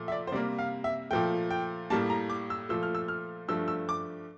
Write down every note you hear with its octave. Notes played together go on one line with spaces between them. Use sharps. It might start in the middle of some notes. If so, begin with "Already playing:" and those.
Already playing: A#2 F3 A3
E5
D5
C5
C3 G3 A#3 D5
F5
E5
A#2 F3 A3 G5
G5
A2 G3 A#3 A5
A#5
D6
E6
A#2 F3 A3 E6
F6
E6
F6
G2 F3 A3 E6
E6
D6